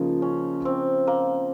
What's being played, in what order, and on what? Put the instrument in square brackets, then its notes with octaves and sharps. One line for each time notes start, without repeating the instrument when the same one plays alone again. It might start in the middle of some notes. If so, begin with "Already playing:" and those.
Already playing: [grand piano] C#3 F3 A#3 D#4 [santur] F4
[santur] C#4
C4
A#3